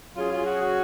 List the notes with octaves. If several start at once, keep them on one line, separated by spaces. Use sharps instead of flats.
F#3 C#4 F4 G#4
F4
F#4
F#4